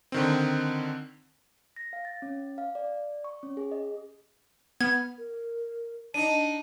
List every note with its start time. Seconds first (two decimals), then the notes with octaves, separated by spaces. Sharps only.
0.12 D3 D#3 C4
1.76 A#6
1.93 F5
2.05 A6
2.22 C#4
2.58 F5
2.75 D5
3.24 C#6
3.43 C#4
3.57 G#4
3.72 D#5
4.81 B3 F6 G#6
5.18 A#4
6.14 D4 D#4 A5 D#7